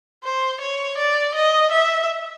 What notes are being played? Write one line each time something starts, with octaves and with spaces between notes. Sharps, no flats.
C5
C#5
D5
D#5
E5